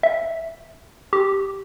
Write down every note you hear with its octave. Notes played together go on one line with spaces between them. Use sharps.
E5
G4